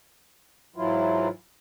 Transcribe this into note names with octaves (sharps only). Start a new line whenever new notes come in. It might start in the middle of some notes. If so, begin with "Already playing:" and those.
G#2 E3 F#3 E4 F4